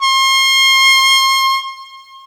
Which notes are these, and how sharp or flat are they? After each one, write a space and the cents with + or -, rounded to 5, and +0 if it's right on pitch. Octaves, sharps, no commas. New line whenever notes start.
C6 +40